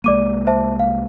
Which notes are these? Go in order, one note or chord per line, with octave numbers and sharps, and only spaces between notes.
C2 G#3 A#3 D5 D6 D#7
C5 E5 A5
F5